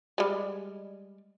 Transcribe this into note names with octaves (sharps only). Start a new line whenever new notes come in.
G3 G#3